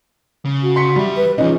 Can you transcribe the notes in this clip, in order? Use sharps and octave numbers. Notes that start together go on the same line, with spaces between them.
C#3
F#4
C6 B6 C#7
E2 G3 E5
B4
B1 E2 F3 G#3 C#4 D#4